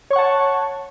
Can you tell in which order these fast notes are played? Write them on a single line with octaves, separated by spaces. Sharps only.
C#5 C#6 F#5 A5